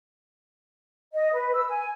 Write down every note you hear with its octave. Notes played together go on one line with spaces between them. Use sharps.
D#5
B4
E6
G#5